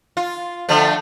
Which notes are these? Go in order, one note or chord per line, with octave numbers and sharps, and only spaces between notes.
F4
D3 F3 A3